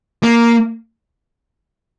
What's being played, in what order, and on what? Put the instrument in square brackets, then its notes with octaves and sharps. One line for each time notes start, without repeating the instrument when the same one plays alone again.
[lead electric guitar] A#3